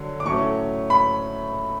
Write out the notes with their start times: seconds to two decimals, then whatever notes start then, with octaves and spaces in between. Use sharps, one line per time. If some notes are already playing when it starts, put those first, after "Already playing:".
Already playing: D3 F#3
0.20 D6
0.25 A2 F#3 A3 C#4 C#6
0.90 B5